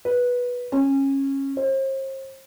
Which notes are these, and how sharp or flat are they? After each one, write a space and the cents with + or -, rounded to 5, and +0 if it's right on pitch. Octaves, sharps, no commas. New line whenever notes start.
B4 -10
C#4 -20
C5 +40